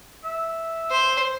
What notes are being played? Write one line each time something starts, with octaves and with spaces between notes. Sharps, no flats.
E5
C5